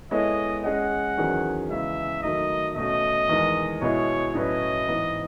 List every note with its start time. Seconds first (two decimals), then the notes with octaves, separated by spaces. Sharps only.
0.11 G#3 B3 E4 A4 C#5 D#5
0.64 G#3 C#4 G#4 D#5 F#5
1.17 E2 D#3 F#3 C#4 G#4
1.69 E2 C#3 G#3 E5
2.23 D#3 F#3 A3 D#4 D#5
2.75 B2 A3 C#4 F#4 D#5
3.29 E2 D#3 G#3
3.81 B2 G#3 B3 E4 C#5
4.35 A2 F#3 C#4 E4 B4 D#5
4.88 G#2 E3 B3